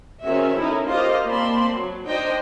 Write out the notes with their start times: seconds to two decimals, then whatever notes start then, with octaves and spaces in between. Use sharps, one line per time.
0.22 D#3 C4 C#4 F#4 G#4 E5
0.54 C#4 D#4 E4 A4 A#4
0.85 F4 G4 A#4 C5 D#5 F5
1.25 A#3 C4 D5 A5 B5 C6
1.71 F#3
2.05 D4 D#4 C5 D#5 G5